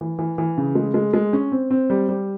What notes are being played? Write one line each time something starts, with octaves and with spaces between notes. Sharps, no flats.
E3
E3
E3
C#3
G#3
G#3
G#3
C#4
C4
C4
G3
G3